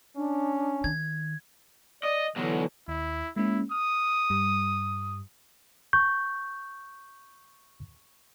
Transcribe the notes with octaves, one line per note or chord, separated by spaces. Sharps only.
C#4 D4
D#3 G#6
D5 D#5
B2 D3 E3 F#3
D#2 E4
G#3 A#3 C#4 E4
D#6 F6
G2 G3
C#6 G6